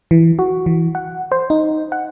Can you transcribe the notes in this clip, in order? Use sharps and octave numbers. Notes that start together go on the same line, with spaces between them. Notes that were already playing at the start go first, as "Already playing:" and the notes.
E3
F#4
E3
F#5
C5
D#4
F#5